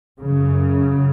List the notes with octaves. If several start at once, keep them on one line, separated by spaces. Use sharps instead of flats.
F#2 C#3